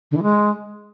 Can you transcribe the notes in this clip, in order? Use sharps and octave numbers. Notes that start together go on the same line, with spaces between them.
D3
E3
G#3